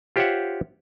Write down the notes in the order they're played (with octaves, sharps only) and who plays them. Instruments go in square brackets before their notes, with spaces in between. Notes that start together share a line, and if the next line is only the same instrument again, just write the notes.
[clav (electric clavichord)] F4 G4 C5 C#5 E5 F#5